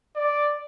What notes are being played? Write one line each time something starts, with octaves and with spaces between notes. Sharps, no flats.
D5